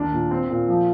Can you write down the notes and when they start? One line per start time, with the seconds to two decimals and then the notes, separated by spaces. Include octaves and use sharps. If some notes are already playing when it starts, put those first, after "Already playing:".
Already playing: D#2 D4
0.12 A#2
0.31 C4
0.50 A#2
0.69 F3